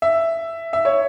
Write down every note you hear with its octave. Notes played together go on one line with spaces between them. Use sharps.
E5
E5
C#5